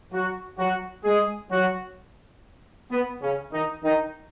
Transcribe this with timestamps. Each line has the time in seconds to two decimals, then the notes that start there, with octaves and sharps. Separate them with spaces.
0.12 F#3 F#4
0.58 F#3 F#4
1.04 G#3 G#4
1.51 F#3 F#4
2.91 B3
3.22 C#3 C#4
3.52 D#3 D#4
3.84 D#3 D#4